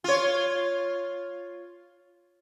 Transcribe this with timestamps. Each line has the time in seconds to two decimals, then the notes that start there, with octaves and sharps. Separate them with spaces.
0.04 F4 C#5